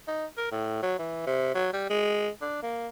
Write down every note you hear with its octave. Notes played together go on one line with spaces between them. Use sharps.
D#4
A#4
A2
F#3
E3
C3
F#3
G3
G#3
D4
A#3